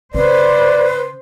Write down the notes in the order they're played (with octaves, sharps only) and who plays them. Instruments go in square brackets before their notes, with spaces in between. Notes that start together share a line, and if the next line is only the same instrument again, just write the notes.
[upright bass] C#3 [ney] B4 [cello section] C5 [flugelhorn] D5